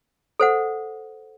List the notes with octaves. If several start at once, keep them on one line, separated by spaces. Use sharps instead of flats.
A4 C5 F#5